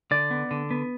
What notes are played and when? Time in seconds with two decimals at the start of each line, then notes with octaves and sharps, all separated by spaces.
0.11 D3 D5
0.31 B3
0.51 D3
0.71 B3